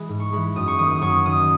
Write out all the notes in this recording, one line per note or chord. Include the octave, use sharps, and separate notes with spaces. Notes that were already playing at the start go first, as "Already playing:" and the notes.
Already playing: E3 G#3 B5
G#2
C#6
E3 G#3 B5
F#2 D#6
C#6
D#3 A#3 D#6
D#6
F#2 C#6
D#3 A#3 D#6